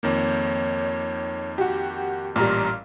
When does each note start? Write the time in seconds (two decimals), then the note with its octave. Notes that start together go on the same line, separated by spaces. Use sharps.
0.03 F2 D#3 A#3 C#5
1.58 F#4 G4
2.36 A1 A#2 G3 A#5 F6